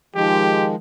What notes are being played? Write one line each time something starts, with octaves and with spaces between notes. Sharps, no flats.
D#3 F3 G#3 G4